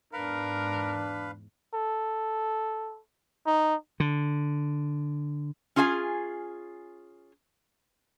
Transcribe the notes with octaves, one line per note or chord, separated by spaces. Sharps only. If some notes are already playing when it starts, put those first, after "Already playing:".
E2 G#2 D4 A#4 B4 F5 B5
A4
D#4
D3
C#4 F4 G#4 E5 G#5